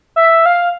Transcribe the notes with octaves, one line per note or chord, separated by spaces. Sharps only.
E5
F5